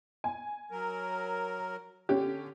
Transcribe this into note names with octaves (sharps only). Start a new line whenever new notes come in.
G#5
F#3 A#4
D3 C#4 G4